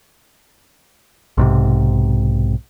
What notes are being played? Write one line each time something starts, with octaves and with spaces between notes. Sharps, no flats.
B1 G#2 C3